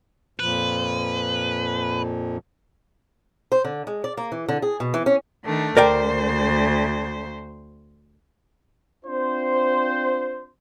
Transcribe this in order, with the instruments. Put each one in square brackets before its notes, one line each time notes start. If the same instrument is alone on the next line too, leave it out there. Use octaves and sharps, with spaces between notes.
[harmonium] F2 A#2 F3 [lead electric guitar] B4
[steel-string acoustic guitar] C5
D3
G#3
D5
A#3
E3
D3
G#4
B2
E3
C#4
[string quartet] D#3 A3 D4
[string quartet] D2 C5 [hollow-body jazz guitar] A#4 D5 G5
[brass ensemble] C4 D4 F4 C5